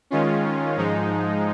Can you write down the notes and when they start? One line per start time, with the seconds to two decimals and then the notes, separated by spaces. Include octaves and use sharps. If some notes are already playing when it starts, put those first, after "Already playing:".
0.10 D#3 G#3 C#4 F4
0.76 G#2 F3 G#3 D#4